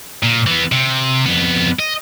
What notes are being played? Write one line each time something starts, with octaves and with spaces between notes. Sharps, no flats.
A#2
E3 B3
C3
F2 B3
D#5